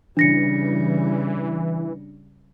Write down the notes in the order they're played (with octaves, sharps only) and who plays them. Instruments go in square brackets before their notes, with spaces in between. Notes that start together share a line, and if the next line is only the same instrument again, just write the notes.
[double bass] C#3 G3 [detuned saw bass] E3 [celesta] D4 A#6 C#7